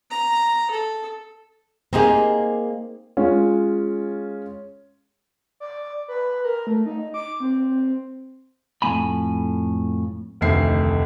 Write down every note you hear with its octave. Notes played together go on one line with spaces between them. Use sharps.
A#5
A4
A#3 C4 D#4 G4 G#4
G#3 C#4 F4
D5
B4
A#4
A3
D#4
D6
C4
F2 A2 A3 C4 G#5 B5
F1 D2 D#3 E5 C7